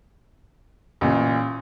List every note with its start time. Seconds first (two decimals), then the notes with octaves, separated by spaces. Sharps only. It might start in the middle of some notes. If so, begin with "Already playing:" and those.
1.01 A1 A#2